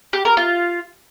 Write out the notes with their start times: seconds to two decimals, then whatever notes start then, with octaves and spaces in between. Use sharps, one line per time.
0.13 G4
0.25 A#4
0.37 F4